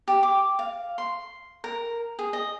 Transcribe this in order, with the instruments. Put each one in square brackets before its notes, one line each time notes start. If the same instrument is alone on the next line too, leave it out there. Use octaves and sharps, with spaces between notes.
[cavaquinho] G4
D6
F5
C6
A#4
G#4
D#5